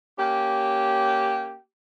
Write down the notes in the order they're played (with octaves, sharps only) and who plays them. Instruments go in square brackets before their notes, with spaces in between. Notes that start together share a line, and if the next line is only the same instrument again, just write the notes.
[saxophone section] A#3 C#4 G4